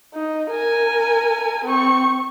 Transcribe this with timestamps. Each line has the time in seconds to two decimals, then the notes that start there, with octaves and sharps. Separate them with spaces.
0.14 D#4
0.50 A#4 G#5
1.65 C4 C#6